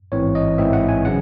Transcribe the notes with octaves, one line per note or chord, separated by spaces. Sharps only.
A1 G#2 E3 C4 C#5
D#5
A1 G#2 E3 C4 E5
F#5
G#5
C#3 F#3 F#5